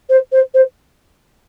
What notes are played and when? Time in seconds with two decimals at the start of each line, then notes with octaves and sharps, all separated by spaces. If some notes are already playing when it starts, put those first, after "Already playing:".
0.09 C5
0.32 C5
0.54 C5